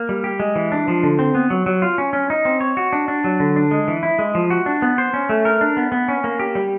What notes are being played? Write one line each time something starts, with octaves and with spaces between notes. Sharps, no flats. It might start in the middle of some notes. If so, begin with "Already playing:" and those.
Already playing: A#3
G3
G4
G#3
E3
D4
F3
D3
C4
B3
F#3
F#3
F4
C#4
C#4
D#4
C4
C#5
F#4
D4
D4
F#3
D3
D4
G#3
E3
E4
G#3
F3
F#4
D4
B3
C5
C#4
A3
A#4
D4
B3
B3
C#4
A#3
G4
G3